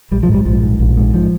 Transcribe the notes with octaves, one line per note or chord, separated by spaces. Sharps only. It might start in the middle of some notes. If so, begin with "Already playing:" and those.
A#1 G3
F3
G#2
G3
A#1 F3
G#2
A#1
G#2
F3